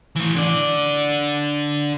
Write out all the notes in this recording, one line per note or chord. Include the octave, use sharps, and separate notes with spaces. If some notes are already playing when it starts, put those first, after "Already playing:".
A2 E3
D3 D5